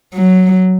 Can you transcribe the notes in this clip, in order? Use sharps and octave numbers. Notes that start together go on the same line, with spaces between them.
F#3